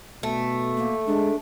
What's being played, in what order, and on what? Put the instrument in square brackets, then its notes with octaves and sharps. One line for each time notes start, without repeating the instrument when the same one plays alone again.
[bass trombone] B2 [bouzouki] A3
[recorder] A#3
[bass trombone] G#3 [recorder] D4